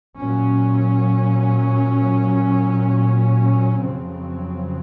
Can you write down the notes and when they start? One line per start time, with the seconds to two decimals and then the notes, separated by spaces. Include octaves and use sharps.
0.18 A#2 F#3 C#4
3.83 F2 C#3 F#3 C4